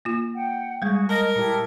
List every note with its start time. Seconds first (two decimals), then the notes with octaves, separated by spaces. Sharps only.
0.05 A#3 F4
0.34 F#5 G5
0.82 G3 G#3 F#4 G#4
1.09 A#4 D#5 A5 A#5 D#6
1.36 A#2 E4 G4 A4